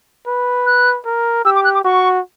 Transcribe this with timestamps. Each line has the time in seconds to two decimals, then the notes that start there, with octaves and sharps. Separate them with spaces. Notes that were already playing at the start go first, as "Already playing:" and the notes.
0.27 B4
0.66 F#6
1.06 A#4
1.45 G4 E6
1.55 D6
1.64 F#6
1.74 D6
1.84 F#4 C#6